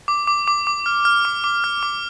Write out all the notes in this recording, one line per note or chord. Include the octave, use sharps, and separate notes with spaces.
D6
D6
D6
D6
F6
F6
D6
D6
F6
D6